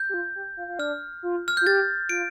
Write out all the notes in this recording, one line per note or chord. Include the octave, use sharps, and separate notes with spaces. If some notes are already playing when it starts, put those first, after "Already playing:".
Already playing: G6
G4
F4
G4
F4
F4
D4 F6
F4
F6
F4 G6
G4 A6
F4 D7